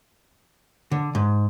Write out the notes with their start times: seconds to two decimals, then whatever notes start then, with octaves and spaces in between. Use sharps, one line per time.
0.92 D3
1.15 G#2